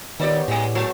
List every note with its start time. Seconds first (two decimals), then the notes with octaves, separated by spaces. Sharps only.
0.20 D#3 B3 D#4 G4 C#5 D5
0.48 A2 G#3 A3 G4
0.75 F#3 G#3